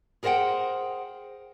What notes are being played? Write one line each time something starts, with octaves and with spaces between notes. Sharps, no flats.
G#4 A#4 C5 D#5 F#5 G5